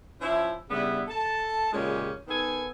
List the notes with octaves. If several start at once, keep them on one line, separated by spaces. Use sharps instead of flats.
F3 C#4 E4
C#3 G3 B3 D4 E4
A4 A5
A#2 C#3 G#3 C#4 G4
D#3 B3 A4 G#5